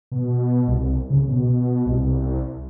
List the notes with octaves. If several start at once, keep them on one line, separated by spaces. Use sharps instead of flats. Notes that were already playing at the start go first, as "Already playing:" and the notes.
B2
C2
C#3
B2
C2